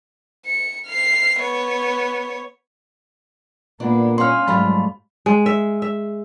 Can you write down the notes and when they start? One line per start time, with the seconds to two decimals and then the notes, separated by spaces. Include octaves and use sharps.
0.46 C#7
0.87 F6 C7
1.40 B3 C#5
3.80 A#2 A#3 B3 D4
4.18 B3 C#4 F5 C6 F6
4.48 G#2 F#3 G3 A3 F4 B5
5.26 G#3
5.46 E5
5.82 E5